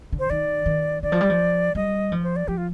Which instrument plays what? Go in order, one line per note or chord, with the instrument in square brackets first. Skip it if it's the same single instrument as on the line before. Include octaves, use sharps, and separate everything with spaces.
[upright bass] D3
[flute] C5
[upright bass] D#3 [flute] D5
[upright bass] D#3
[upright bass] D#3 [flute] D5
[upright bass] F3
G3
F3
[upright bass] G3 [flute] D#5
[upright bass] F3
[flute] C5
D5
[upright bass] F3 [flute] G4
[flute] F4